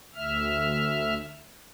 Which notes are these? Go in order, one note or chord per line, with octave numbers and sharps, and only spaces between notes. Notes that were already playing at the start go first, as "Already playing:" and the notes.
D2 E5 F6